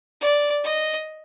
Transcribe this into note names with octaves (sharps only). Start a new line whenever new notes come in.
D5
D#5